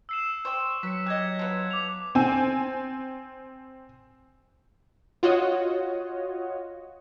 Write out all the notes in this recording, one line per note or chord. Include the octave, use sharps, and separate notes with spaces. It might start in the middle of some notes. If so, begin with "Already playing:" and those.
E6 C7 E7
C5 D5 G5 C#6
F#3 B4 B6 C#7
G4 D#5 F#6 G#6
F3 B3 B4
D6 F7
C4 G#5
F4 F#4 C#5 D#5